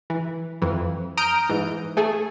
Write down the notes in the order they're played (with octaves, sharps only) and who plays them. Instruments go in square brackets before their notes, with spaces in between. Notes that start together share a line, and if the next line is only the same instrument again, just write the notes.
[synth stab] E3
F2 E3
A#5 D#6 F6 G6 D7
G#2 E3
A3 G#4 A4